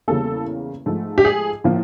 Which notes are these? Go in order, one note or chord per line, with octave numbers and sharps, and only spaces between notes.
E2 C#3 E3 G3 A#3 A4
G#2 F3 A3
G4
G#4
A2 F3 A#3